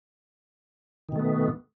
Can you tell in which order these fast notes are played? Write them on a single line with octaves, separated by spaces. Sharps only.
D#3 B2 A3 B3